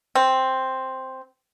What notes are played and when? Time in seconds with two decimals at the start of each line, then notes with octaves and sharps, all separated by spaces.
0.15 C4